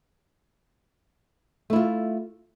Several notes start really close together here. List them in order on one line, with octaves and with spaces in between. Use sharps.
A3 E4 F4